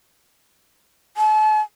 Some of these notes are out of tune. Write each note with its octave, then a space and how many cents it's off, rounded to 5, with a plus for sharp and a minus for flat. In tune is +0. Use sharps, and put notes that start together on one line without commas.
A5 -40